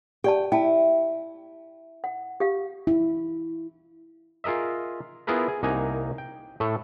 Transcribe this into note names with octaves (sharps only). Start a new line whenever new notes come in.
G4 D5 G5 A5
E4 G5 A5
F#5
G4 F5
E4
F4 G#4 A#4 D#5 E5
B3 E4 F4 G#4 A#4 B4
G#4
C2 A#3 D#4 F#5 G#5 A#5
G5
A2 A3 A4